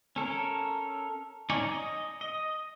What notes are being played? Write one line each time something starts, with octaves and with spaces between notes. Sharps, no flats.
C#4 A4 A#4 C#5
C#4 D#4 C#5 D5 G#5
D#5
D#5